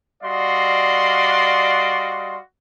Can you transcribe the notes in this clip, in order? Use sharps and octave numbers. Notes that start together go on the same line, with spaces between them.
G3 F#4 D5 D#5 F5 C6